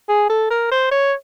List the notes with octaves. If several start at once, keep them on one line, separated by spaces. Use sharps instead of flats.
G#4
A4
A#4
C5
C#5